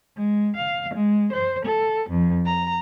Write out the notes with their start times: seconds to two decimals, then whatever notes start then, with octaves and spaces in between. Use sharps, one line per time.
0.15 G#3
0.55 F5
0.94 G#3
1.33 C5
1.64 A4
2.09 F2
2.45 A#5